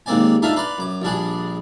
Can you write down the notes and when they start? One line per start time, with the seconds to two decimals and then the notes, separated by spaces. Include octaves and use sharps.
0.06 D#2 G#3 A#3 C4 D5 G#5
0.42 A3 D4 D#4 F4 E5 F5
0.56 B4 D5 A#5 C6
0.78 F#2 D6
1.02 A#1 G3 D4 G#4